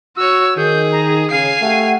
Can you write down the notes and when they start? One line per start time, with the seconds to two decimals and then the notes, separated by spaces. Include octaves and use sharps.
0.17 F#4 C#5 E6
0.57 D#3 G#4 G6
0.92 A#5
1.31 C#3 F5 G#5 C7
1.62 A3 G4 F#5